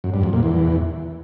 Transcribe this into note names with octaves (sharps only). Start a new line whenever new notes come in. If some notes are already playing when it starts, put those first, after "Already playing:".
F#2
G2
F2
A#2
E2